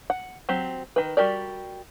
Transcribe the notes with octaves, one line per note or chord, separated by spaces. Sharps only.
F#5
F#3 C4 G4
D#3 B4
G3 F#4 G4 A#4 D5